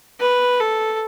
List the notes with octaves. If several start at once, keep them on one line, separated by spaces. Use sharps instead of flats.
B4
A4